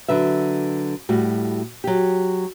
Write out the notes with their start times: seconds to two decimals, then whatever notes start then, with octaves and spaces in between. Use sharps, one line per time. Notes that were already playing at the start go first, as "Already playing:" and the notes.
0.08 D3 F#3 B4 E5
1.09 A2 G3 F#4
1.84 F#3 G4